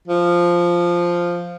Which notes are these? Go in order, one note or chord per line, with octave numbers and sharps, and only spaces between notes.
F3